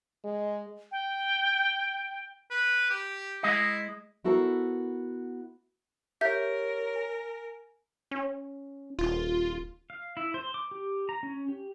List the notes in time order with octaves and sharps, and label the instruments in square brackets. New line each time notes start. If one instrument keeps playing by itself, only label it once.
[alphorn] G#3
[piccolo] G5
[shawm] B4
G4
[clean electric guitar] G#3 D#5 [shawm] E4
[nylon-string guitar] B3 E4 F#4 A4 A#4 C5
[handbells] G4 C#5 [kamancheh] A#4 [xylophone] E5 G6
[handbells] G#5
[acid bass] C#4
[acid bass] D#1 [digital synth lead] F4
[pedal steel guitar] F5
E4
C5
D6
G4
A#5
C#4
G4